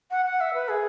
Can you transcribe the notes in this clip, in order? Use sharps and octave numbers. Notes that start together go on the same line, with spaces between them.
F#5
F#5
E5
B4
G#4